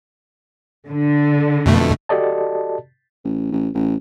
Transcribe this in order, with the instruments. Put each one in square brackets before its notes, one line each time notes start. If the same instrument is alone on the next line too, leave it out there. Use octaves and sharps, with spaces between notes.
[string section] D3
[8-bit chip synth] F2 B2 A3
[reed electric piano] F#4 G4 A4 D5 D#5 A5
[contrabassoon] A1
A1
A1